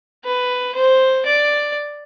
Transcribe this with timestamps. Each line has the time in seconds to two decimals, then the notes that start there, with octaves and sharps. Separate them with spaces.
0.25 B4
0.75 C5
1.26 D5